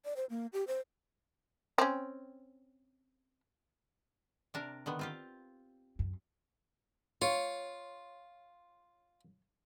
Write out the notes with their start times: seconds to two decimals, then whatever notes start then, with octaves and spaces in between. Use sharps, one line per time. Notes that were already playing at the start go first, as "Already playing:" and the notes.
0.05 D5
0.16 C5
0.30 A#3
0.53 G4
0.67 C5
1.78 C4 C#4
4.54 C3 D4 A#4
4.86 D3 D#3 B3
4.99 C4 F4 G4
5.99 F#2
7.22 F4 C#5